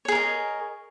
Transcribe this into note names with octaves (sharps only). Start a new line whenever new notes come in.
G#4 A#4 C#5 D#5